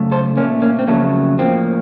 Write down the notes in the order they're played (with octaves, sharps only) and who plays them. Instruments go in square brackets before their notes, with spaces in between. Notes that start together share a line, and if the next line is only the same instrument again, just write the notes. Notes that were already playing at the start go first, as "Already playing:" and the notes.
Already playing: [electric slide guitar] F#2 C#3 A3
A4 C5
A#2 A#3 C#4
A3
A#3 C#4
C4
F2 C#3 F#3 A3 A#3
A2 F3 A#3 C4